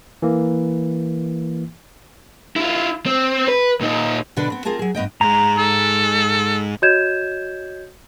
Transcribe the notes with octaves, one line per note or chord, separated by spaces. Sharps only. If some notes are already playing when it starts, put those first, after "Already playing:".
E3 A#3
E4 F4
C4
B4
A#2 D#4
B2 D3 D4 A4 B4
B3 C4
C4 F4 G#4 A#4 A5
F#3 G#4
G2 B3 D#5 G5
G#2 G#3 A#5
A4
F#4 C#5 D#5 G6 G#6 E7